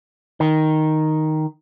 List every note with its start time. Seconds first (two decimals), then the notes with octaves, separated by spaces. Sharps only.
0.40 D#3